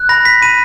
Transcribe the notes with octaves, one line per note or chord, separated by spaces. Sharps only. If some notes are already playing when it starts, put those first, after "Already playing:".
Already playing: F#6
B5 A#6
B6
B5 D#7